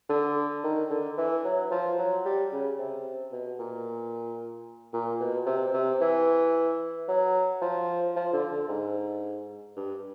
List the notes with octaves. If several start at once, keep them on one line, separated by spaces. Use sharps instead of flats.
D3
D#3
D3
E3
F#3
F3
F#3
G3
C#3
C3
B2
A#2
A#2
B2
C3
C3
E3
F#3
F3
F3
D3
D3
G#2
G2